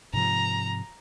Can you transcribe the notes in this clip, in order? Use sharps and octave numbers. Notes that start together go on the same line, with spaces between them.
G#2 C3 F3 A#5